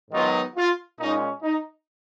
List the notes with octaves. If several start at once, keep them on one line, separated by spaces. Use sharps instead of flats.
G#2 D#3 F#3 B3 D#4 F4
F4
A#2 G#3 C#4 D#4
D#4